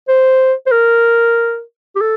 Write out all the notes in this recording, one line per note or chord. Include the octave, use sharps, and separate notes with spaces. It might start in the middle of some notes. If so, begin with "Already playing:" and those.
C5
C5
A#4
G4
A4